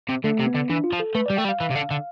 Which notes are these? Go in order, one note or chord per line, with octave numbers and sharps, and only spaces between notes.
C3
D3 A3
C3
B3
D3
E3 D4
F4
F3
A4
A3 B4
G3 D5
A3 G5
G3
F5
E3
C3
D3
D3